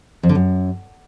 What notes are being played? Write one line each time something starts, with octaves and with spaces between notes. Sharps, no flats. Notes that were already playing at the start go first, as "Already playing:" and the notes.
F2
D3
F#2